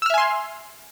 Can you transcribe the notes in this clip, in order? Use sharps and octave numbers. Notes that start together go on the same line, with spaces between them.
E5 G#5 C6 E6 F6